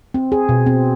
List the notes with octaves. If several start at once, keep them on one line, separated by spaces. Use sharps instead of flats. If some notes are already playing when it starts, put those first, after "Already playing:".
C4
G#4
B2
C4